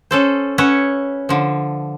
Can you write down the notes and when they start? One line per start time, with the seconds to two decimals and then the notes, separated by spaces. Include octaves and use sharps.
0.11 C#4 A4 C5
0.58 C#4 B4 C#5 E5 F#5
1.29 D3 F3